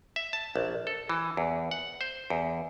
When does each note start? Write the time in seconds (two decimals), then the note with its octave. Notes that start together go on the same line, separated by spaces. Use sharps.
0.16 E5
0.33 A5
0.56 A#1
0.87 A4
1.09 E3
1.37 E2
1.71 F#5
2.01 C5
2.30 E2